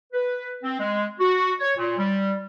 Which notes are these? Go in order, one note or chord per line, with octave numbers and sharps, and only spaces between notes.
B4
C4
G#3
F#4
C#5
A#2
G3